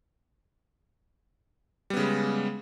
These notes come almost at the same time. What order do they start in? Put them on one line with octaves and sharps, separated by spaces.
G3 B3 C#3 G#3